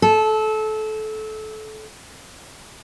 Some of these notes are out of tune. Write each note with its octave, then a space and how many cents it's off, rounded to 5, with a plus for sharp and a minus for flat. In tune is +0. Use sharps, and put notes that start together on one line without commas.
A4 -25